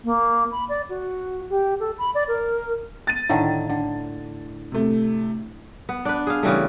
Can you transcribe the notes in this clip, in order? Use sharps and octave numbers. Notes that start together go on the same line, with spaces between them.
A#3
B5
D5
F#4
G4
A4
B5
D5
A#4
A6 D#7
A2 D3 D#3
D3
C3 A3
B3
D4 B4
G#4 F5
C#3 E3 G3 A3